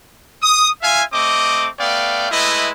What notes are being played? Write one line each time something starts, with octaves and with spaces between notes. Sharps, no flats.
D#6
F4 E5 F5 G#5
A3 C4 D#5 D6
A3 B3 D5 F5 G5
G#3 A3 E4 B4 D#5